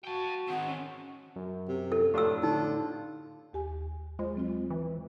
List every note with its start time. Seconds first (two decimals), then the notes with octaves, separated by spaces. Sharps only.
0.05 F#4 G5 A5
0.48 D#3 C4 F#5
0.66 C#4
1.36 F#2
1.69 C3
1.92 A4
2.14 F2 A2 D4 F4 G4 E6
2.43 D3 D#4
3.53 D#2 G4 G#5
4.19 G#3 F4 C5
4.35 F#3 C4 F4
4.70 E3